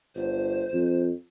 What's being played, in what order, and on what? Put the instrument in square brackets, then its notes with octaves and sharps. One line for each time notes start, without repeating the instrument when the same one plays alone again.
[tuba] G1 [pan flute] C5
[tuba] F2